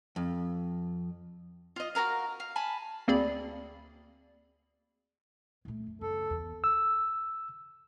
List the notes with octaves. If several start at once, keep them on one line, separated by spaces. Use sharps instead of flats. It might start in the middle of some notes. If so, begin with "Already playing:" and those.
F2
F4 D#5
F#4 G#4 A#4 F5
F5
G#5 A5 B5
D2 A#3 C4 G#4 D5 B5
A#2 A3
F#2
F#1 A4
E2
E6